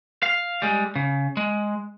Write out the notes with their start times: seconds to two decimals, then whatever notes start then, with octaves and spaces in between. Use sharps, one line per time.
0.23 F5
0.62 G3 G#3
0.96 C#3
1.37 G#3